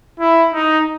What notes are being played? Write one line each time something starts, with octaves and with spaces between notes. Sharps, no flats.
E4
D#4